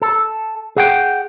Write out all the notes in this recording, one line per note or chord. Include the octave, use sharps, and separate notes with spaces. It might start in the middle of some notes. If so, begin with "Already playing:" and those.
A4
G#4 F#5 G5